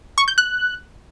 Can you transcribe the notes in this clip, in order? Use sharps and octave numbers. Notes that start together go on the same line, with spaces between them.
C#6
G6
F#6